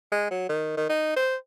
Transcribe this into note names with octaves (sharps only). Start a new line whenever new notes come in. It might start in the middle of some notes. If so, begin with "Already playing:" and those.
G#3
F#3
D#3
D#3
D#4
C5